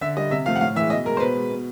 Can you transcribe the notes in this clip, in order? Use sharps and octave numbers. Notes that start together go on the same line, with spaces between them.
D3 E5
G3 D#5
C3 E5
F3 A3 F5
F#5
A2 F5
E3 G#3 E5
B2 D#5
G#3 A#4
C5
B2 B4
G#3
B2